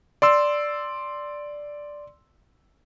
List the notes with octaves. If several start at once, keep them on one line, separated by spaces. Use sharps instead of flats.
D5 C6 E6